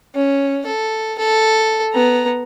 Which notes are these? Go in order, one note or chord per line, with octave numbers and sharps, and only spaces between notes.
C#4
A4
A4
B3 A#5